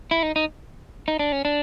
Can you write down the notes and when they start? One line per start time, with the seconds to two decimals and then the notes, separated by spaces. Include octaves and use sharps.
0.11 E4
0.23 D#4
0.36 D#4
1.08 D#4
1.19 D4
1.32 C#4
1.45 D4